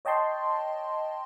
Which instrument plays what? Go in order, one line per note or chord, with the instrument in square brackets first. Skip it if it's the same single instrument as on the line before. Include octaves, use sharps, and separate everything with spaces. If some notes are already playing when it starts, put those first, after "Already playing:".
[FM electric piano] C#5 D#5 G5 A5 C6